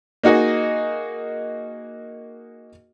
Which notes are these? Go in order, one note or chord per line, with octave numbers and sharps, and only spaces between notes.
A#3 D#4 F#4 G#4 D#5